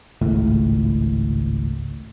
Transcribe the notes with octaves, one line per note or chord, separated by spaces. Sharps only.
G#1 C#2 A2